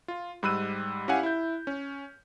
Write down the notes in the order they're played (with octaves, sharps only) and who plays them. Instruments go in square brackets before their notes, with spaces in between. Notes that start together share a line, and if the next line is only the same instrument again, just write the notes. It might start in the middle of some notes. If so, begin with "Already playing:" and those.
[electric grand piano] F4
G#2 G3 B5 E6 F#6 D#7
C#4 E4 G4 F5 F#5 G#5
E4 G6
C#4